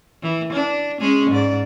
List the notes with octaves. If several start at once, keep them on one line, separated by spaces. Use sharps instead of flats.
E3
D4
G#3 C#4 G#4
G#2 D5